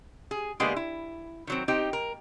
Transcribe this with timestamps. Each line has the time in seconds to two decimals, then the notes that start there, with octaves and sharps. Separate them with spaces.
0.31 G#4
0.60 D3 G#3 A#3 B3 G4 G#4
0.76 E4
1.47 D#3 F#3 C4
1.68 C4 D#4 G4
1.93 A#4